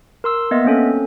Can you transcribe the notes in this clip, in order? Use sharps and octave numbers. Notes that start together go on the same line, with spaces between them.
A#4 C6 E6
A#3 B3 D#5 E5
A#3 C4 C#4 A4